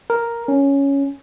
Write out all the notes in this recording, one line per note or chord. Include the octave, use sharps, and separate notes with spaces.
A#4
C#4